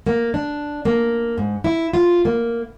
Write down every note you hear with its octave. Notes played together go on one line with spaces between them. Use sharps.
A#3
D4
A#3
G#2
E4
F4
A#3